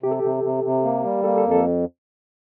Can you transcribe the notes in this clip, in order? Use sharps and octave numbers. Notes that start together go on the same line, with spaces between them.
C3 G4
A4
C3 G4
C3
C3
A#3
G3
A#3 A4
A4
F2
A4